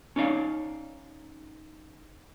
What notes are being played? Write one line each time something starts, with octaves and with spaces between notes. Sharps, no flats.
C#4 D#4 C#5 D5 F5